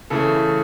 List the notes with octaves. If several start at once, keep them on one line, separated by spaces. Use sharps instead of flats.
C#3 E3 A3 A4